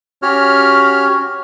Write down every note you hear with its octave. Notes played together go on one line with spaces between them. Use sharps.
C#4 F#4 G4 C#5 F6